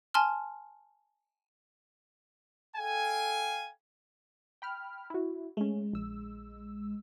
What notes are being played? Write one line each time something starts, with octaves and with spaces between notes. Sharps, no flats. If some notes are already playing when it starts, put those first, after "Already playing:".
G#5 A5 C6 F6
A4 F5 G5 G#5
G5 B5 F6
E4 F#4
G#3 A3 C#4
A#1 E6